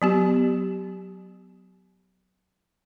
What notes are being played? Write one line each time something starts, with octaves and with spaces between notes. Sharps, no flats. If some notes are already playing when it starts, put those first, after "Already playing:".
F#3 B3 G4